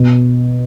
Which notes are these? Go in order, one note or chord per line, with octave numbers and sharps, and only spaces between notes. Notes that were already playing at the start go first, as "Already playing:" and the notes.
Already playing: B2